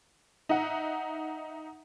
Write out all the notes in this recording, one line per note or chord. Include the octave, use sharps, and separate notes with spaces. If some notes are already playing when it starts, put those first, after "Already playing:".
D#4 E5 F#5